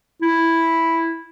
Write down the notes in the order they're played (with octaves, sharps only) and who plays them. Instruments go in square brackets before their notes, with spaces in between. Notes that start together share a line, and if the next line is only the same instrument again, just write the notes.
[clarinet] E4